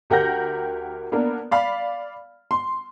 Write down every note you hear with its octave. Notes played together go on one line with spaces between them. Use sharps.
D2 G4 A#4 F#5 G6 A#6
A#3 B3 D4 A#4
D5 F5 B5 B6
C6